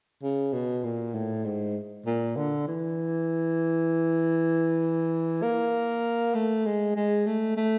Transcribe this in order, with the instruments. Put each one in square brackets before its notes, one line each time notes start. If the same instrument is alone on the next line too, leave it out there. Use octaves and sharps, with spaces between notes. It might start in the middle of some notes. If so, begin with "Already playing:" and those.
[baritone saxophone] C#3
B2
A#2
A2
G#2
A#2
D3
E3
A#3
A3
G#3
G#3
A3
A3